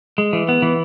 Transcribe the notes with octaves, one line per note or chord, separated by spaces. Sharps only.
G#3
E3
B3
E3